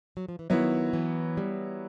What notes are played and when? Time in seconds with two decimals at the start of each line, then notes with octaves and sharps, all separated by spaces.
0.17 F#3
0.29 F3
0.39 E3
0.50 D#3 F#3 B3 E4
0.93 E3
1.37 G3